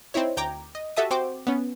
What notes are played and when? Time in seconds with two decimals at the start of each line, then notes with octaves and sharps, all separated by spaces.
0.14 C4 D#4 E4 C#5
0.37 D2 G5 A#5 D6 G#6
0.75 D#5
0.97 F#4 G4 A4 E5 A5 D#6
1.11 C4 F#4 C5 G5 D6
1.47 B3 C#4